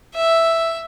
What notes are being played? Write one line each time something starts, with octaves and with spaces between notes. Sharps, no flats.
E5